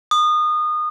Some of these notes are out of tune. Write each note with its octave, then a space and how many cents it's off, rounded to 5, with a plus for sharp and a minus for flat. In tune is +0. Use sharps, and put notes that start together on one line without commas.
D#6 -25